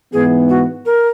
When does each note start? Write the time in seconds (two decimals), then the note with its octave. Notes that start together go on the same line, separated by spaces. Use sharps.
0.13 G#2 E3 B3 G#4
0.49 F#4
0.85 A#4